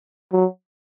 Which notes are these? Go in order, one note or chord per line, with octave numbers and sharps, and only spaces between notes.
F#3